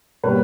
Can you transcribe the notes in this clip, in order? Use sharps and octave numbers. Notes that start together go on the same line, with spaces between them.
B2 G3 A#3 B4 C#5